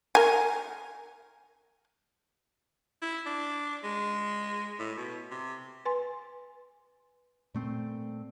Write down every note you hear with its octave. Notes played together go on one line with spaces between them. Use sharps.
A#4 G#5
E4
D4
G#3
A2
B2
C3
B4 G#5 C6
A#2 A3 C4